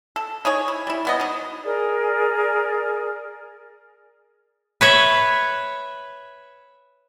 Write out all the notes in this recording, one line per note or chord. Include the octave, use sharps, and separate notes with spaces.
A4
D#4 G#4 C#5
E4
G3 E4
E3 B3 D#5
F#3 D#4
G#4 A#4 D5
B4 C#5 E5